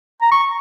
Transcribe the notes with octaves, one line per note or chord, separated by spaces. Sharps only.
A#5
C#6